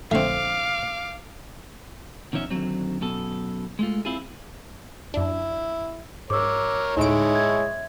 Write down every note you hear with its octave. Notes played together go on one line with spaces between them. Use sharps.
A#1 D3 A3 C4 F5 C#6 D6
B2 D#3 F3 C#4 E5
D#2 A#2 D3 F#3 C4
F#2 B2 A4
G#3 A3 F4
C4 E4 F4 G#4
F#2 D4 E4
G#2 A#4 C#5 D6 E6
D2 A2 G#3 D#4 E4 C#5 D#5 D7
E5 G#6